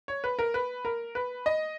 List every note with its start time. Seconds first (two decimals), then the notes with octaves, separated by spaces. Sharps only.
0.08 C#5
0.24 B4
0.39 A#4
0.54 B4
0.85 A#4
1.15 B4
1.46 D#5